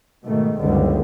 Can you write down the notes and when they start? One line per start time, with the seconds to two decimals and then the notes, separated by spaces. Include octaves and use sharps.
0.25 G#2 B2 D#3 A3
0.58 F#1 C#2 D3 D#3 G3